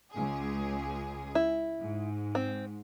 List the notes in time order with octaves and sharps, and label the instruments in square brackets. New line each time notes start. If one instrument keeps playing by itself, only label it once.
[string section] C#2 G#4
[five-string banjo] E4
[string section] G#2
[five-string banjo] C4